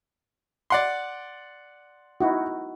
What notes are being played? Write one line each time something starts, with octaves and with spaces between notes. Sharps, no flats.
D5 F#5 C6
D#4 E4 F#4